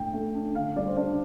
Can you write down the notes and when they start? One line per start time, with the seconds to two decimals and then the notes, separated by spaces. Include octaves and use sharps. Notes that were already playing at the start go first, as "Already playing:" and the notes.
Already playing: A2 D4 G5
0.13 A3
0.35 D4
0.55 D3 F5
0.76 G3 D5
0.86 C5
0.97 D4 D5